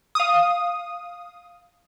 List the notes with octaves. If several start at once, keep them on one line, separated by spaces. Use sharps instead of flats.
F5 D#6